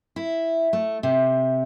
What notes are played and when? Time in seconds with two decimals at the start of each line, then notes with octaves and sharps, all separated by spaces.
0.16 E4
0.73 A3
1.03 C3